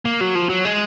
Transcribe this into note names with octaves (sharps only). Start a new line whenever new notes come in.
A#3
F#3
F3
F#3
G#3